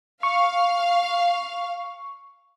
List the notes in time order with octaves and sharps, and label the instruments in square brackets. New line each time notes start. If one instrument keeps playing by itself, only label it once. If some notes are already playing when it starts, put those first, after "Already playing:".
[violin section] F5 [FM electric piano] C#6